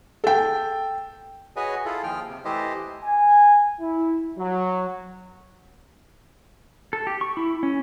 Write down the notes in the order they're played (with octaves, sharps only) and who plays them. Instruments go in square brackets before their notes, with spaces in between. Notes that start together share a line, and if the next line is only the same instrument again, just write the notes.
[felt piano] A4 G5
[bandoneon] F#4 G#4 B4 C#5 D#5 G#5
E4 F4 G#4 A4
D#2 F3 G5 F6
C3
E3 A3 E4 G4 C5 D#5
[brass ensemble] G#5
E4
F#3
[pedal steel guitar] A4
G4
C#6
E4
C#4